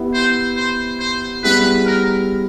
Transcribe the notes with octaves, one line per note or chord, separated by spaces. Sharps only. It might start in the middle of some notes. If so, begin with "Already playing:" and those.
Already playing: B3 E4 G4
C5
C5
C5
G3 B3 E4 G#4 B4
A#4